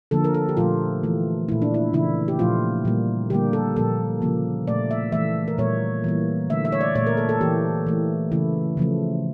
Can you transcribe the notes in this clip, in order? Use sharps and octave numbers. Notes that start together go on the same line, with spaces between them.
D3 F3 A#3 A4
A#4
A4
G4
A#2 F3 A3 F4
E3 A3
A#2 A3 E4
D4
E4
C#3 E3 A3 E4
G4
A#2 F3 A3 F4
A#2 G3 A#3
D3 G3 A#3 G4
A4
A#2 F3 A#3 A4
C#3 F3 A#3
A#2 A3 D5
E5
E3 A3 E5
A#4
A#2 G3 A#3 C#5
E3 G3 A#3
D3 A3 E5
E5
C#5
D5
A#2 A3 C#5
A#4
A4
A4
E3 A#3 G4
E3 A3
C#3 E3 A3 E4
C#3 F3 A3